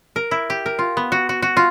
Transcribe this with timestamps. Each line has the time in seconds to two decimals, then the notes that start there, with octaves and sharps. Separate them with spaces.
0.16 A#4
0.31 E4
0.50 G4
0.66 A#4
0.79 F4
0.97 B3
1.12 F#4
1.29 F#4
1.42 F#4
1.57 F4